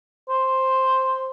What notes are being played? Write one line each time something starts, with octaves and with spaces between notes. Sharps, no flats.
C5